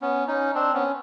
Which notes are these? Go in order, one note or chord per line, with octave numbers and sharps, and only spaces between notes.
B3 C#4
C#4 D#4
C4 D4
B3 C#4